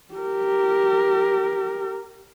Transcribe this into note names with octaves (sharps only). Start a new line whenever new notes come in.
G4 A#4